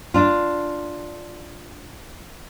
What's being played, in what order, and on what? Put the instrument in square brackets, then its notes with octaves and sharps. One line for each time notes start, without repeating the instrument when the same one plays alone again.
[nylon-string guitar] D4 F4